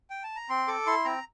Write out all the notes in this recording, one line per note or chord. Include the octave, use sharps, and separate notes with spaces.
G5
A5
A#5
C4 C6
A4 D6
E4 C6
C4 A#5